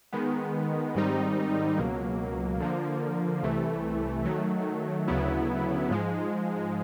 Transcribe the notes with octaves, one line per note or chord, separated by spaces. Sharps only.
D#3 G#3 B3
G#2 D#3 G3 C4 D#4
C#2 B2 F#3 A#3
D3 F3 A#3
C2 C3 E3 A3
D#3 F#3 A3
D2 C#3 F#3 B3 E4
G#2 F3 G#3